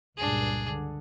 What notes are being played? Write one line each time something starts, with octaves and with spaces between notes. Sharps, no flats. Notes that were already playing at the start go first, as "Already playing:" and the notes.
C#2 G2 A#2 D4 G#4
D3